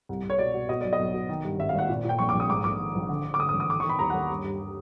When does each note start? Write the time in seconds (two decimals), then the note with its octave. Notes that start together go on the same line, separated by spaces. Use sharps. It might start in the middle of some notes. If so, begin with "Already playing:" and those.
0.09 C2
0.23 C2
0.30 C#5
0.39 B2 D5
0.54 B2
0.69 B2 D#5
0.81 B1 D5
0.93 D#5
0.99 B1
1.14 B2
1.29 D#3
1.44 G2
1.59 G#1 E5
1.69 F5
1.75 G#1 F#5
1.89 A#2
2.04 A#2 G5
2.19 A#1 C#6
2.29 D6
2.34 A#1
2.40 D#6
2.49 G#2 D6
2.64 A#1 D6
2.80 D#3
2.95 A#1
3.09 D3
3.25 D3
3.34 D6
3.39 D3 D#6
3.49 D#6
3.54 A1
3.60 D#6
3.69 D#3 D6
3.80 C#6
3.84 D#3
3.89 B5
3.99 D#2 A#5
4.10 F#5
4.14 D#2
4.30 G2
4.44 G2